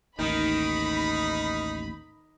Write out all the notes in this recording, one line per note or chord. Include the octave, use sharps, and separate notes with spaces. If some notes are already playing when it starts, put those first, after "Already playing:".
A1 D#2 D#3 D#4 B5